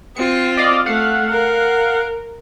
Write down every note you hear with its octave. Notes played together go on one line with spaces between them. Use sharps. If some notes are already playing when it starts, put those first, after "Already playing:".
C4 F4 C#7
D5 D#5 F5
A3 F5 F#5
A#4